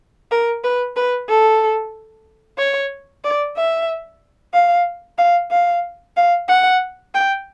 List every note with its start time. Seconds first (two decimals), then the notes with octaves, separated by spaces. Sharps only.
0.32 A#4
0.64 B4
0.96 B4
1.29 A4
2.58 C#5
3.24 D5
3.57 E5
4.54 F5
5.18 F5
5.51 F5
6.17 F5
6.48 F#5
7.14 G5